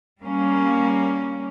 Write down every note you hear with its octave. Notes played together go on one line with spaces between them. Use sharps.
G3 A#3 C#4